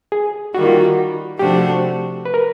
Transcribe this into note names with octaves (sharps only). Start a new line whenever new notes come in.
G#4
D#3 G3 A#3 F#4
F4
F#4
C3 F3 A3 D4 F#4 G4
B4
A#4